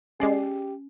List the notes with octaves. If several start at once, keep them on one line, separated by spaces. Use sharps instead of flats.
G#3 C#4 G4 D5 C7